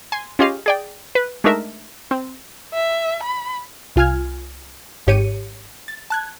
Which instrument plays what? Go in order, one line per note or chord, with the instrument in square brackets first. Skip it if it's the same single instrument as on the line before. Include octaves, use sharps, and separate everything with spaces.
[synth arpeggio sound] G#5 C6
C#4 F4 G4 G#4 D#5 F5
G#4 D5 G5
B4
G#3 A3 D4 D#4 A#4 E5
C4
[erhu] E5
B5
[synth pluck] C2 F4 G#5 F6 G#6
G#1 G#2 G4 C#5 C#7 D#7
A6
A5 F#6 G#6